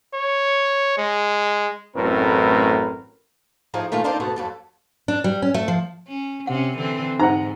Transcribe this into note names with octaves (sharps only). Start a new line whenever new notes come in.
C#5
G#3
A1 F#2 A2 C4 A#4 B4
A2 F3 D#4 G#4
A#2 D#3 E3 A3 F4
C4 D4 D#4 F4 A#4 C5
D2 B2 A4 F#5
F2 F#3 A4
D4
G3
C#4
A3
F3
C#4
C3 C4 C#4 F#5
D3 E3 C4
G#2 D#4 C5 F#5 A#5